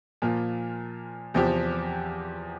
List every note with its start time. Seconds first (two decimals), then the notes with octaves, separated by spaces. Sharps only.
0.22 A#2 F3 A#3 F4
1.34 E2 C3 F3 C4 G4